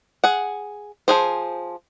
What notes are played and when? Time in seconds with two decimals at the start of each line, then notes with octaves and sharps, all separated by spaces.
0.24 G#4 F#5
1.08 F3 G#4 C5